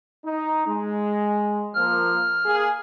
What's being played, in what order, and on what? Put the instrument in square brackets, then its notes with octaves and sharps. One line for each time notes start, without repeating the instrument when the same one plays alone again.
[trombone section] D#4
G#3
[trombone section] F3 A#3 [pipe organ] F6
[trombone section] A#3 G#4